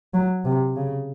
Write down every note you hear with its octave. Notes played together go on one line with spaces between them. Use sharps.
F#3
C3
C#3